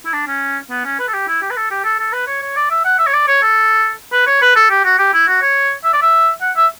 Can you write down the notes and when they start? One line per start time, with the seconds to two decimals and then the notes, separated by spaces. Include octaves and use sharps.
0.05 E4
0.13 D4
0.27 C#4
0.70 B3
0.85 C#4
0.99 B4
1.08 A4
1.14 G4
1.28 E4
1.42 G4
1.50 B4
1.57 A4
1.71 G4
1.85 A4
1.99 A4
2.13 B4
2.27 C#5
2.42 C#5
2.56 D5
2.71 E5
2.85 F#5
2.99 E5
3.07 C#5
3.14 D5
3.28 C#5
3.42 A4
4.13 B4
4.27 C#5
4.42 B4
4.56 A4
4.70 G4
4.85 F#4
4.99 G4
5.13 E4
5.28 F#4
5.42 C#5
5.84 E5
5.93 D5
6.02 E5
6.41 F#5
6.56 E5